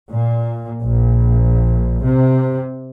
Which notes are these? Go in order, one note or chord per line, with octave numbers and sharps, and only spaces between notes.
A#2
A#1
C3